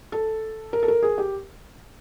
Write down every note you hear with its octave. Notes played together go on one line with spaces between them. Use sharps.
A4
A#4
A4
A#4
G#4
G4